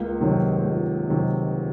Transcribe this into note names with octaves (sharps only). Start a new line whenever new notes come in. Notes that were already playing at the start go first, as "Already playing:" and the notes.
Already playing: C#2 A#3
C3 D#3 F#3
C#2
C3 D#3 F#3